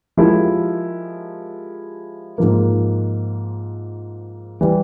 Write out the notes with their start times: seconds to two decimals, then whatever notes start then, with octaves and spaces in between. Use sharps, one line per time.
0.17 F3 G#3 E4 G4 A#4
2.38 G#2 F3 A#3
4.61 E3 G3